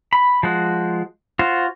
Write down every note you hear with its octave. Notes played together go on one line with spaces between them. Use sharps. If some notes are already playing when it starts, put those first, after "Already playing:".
B5
F3 G#3 F#4
F4 F#4 C5